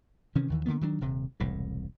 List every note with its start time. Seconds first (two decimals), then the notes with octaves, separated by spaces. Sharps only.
0.35 C3 D#3 E3 C#4
0.50 D#2 D#3 E3
0.66 D3 F#3 A#3 B3
0.81 D#3 F#3 G3 D4
1.01 D#1 C3
1.40 E1 C2 A2